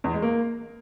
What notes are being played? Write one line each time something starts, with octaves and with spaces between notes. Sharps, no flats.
E2
G#3
A#3